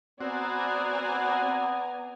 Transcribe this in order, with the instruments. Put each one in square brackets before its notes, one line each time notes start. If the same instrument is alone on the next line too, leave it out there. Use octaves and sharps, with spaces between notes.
[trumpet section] B3 [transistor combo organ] C4 F#4 [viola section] D5 G#5 A#5